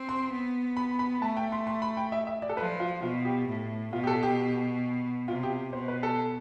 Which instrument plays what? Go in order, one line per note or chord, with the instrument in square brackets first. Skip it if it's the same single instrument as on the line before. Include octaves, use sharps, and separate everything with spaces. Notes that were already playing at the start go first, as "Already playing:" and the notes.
Already playing: [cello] C4
[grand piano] C6
[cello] B3
[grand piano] B5
B5
[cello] A3 [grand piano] A5
[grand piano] G5
C6
C6
B5
G5
E5
E5
D5
A4
[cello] F3 [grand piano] B4
[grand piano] F4
[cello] B2 [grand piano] F4
[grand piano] G4
[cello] A2
[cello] B2 [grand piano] F4
[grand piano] G4
A4
G4
[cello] C3 [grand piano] F4
[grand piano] G4
[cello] B2 [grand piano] C5
[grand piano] B4
A4